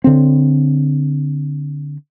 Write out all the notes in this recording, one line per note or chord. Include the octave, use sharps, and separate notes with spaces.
D3 C4